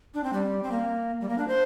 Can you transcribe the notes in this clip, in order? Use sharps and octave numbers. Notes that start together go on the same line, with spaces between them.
D4
C4
G3
C4
A#3
G3
A#3
D4
C5